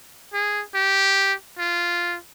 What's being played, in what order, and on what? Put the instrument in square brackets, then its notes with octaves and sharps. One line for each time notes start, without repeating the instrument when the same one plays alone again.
[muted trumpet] G#4
G4
F4